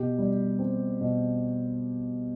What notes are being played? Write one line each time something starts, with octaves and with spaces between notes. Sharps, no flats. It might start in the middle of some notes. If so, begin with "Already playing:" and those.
Already playing: B2 G4
G3
C4
B2